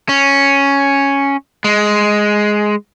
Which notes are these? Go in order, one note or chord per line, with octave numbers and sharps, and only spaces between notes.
C#4
G#3